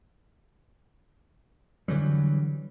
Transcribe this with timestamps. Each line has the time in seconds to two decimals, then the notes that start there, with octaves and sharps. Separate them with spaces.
1.88 D3 E3 F#3 G3